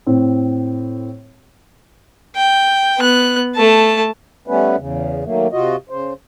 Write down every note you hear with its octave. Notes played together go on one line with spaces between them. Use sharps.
A2 C4
G5
B3 F#6
A3 A5
G3 A3 B3 C#4 B4
E2 C#3
D#3 F#3 A3 A#3
C3 F4 F#4 D#5
C#3 C5